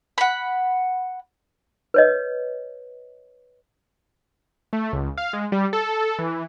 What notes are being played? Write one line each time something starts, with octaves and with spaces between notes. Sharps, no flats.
F#5 B5
B4 C#5 D#5
A3
C#2
F5
G#3
G3
A4
E3